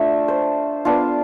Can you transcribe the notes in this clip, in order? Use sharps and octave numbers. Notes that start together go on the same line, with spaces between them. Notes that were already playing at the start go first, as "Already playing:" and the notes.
Already playing: A3 D4 F4 E5
C5
B3 D4 F4